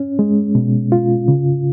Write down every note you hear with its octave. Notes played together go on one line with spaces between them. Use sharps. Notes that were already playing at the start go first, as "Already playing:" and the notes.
Already playing: C#4
G#3
B2
F4
C#3